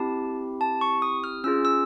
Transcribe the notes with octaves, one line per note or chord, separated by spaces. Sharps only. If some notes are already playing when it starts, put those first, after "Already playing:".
Already playing: C4 E4 G4 A5
A5
C#6
D#6
F6
C#4 F4 G#4 E6
E6